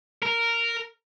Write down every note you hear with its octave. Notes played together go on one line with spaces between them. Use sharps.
A#4